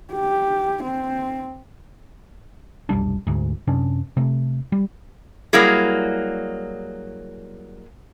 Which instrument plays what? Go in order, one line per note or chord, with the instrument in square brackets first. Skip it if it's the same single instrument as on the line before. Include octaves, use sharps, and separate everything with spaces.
[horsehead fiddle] G4
C4
[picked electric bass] F1 B1 G3 D4
D2 G#2
F#2 C3 C#4 D4
C3 A3
G3
[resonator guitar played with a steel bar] F#3 G3 A#3 E4 G#4